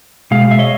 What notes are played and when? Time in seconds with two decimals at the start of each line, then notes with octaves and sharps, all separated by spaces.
0.31 B2 G#3 F5
0.51 E5
0.59 C#5 D#5